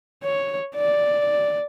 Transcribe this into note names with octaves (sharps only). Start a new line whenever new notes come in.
C#5
D5